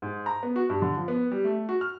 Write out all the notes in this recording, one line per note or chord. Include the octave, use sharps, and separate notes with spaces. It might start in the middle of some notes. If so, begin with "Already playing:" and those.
G#2
A#5
B3
F#4
G2
D3
F3
B3
G3
A3
F#4
F6